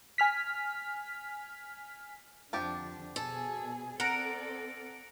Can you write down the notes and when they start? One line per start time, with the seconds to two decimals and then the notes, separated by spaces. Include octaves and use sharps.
0.18 G#5 F6 B6
2.53 F2 D3 F3 D4 G4
3.16 B2 G#4 A4
4.00 C4 A4 A#4 D5 F#5 A#5 D7